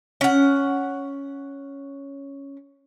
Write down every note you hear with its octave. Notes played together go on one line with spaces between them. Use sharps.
C#4 F#5